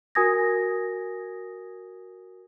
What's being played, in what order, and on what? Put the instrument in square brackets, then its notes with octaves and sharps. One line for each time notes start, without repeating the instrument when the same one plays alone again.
[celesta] F#4 A#4 G#5 D#6 G#6 A#6